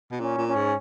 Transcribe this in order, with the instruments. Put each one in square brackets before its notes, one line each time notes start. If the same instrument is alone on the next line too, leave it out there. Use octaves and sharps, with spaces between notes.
[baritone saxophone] B2
[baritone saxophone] A#2 [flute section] C#4
[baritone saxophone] A#2
[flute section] C#4
[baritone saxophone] G#2